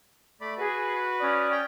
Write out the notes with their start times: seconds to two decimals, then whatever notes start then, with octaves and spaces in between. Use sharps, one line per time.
0.41 A3 D5 B5
0.58 F#4 G#4 B4
1.21 C#4 D5 D#6
1.52 G5